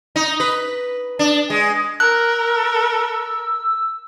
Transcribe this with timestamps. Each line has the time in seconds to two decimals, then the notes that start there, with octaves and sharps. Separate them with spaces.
0.16 D#4
0.40 B4
1.19 D4
1.50 G#3
2.00 A#4 E6 F#6